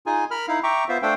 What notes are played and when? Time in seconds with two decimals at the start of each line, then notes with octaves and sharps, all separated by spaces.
0.06 D#4 F4 G#4 G#5
0.31 A#4 B5 F6
0.48 D#4 E4 F5
0.64 E5 G5 A#5 C#6 D6
0.89 B3 F4 C5 E5 F5
1.02 A3 D4 A4 C5 F5 G5